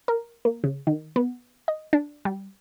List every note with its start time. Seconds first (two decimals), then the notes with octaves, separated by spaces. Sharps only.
0.08 A#4
0.45 A#3
0.64 C#3
0.87 D#3
1.16 B3
1.68 D#5
1.93 D4
2.25 G3